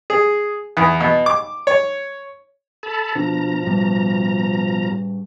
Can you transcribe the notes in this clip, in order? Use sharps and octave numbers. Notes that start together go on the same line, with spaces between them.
G#4
E2
B2
D6
C#5
A4 A5 B5
B2 F3 D4 A#5
A2 G3